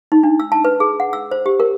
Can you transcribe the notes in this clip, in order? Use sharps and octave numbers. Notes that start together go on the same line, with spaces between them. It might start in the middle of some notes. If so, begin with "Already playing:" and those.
D#4
D4
E6
A5
B4
G#4
F#5
E6
C5
G4
A#4